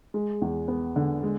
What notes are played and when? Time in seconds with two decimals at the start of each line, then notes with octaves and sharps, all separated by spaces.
0.14 G#3
0.42 E2
0.68 B3
0.96 D3
1.23 G#3